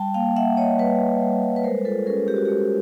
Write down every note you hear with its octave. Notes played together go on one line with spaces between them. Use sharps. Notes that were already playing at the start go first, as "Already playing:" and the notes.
Already playing: G3 G5 A5
A#3 F5 G5
A#3 E5 F#5
A#3 C#5 D#5
G3 B4 C#5
G3
G3
G3
B4
G#3 A#4 C5
F4 A4 B4
C#4 G#4 A#4
G#3 G4
F#4
G#3 G4